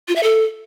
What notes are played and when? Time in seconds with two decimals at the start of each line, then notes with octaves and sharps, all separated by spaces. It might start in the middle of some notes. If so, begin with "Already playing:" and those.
0.08 F4
0.16 E5
0.23 A4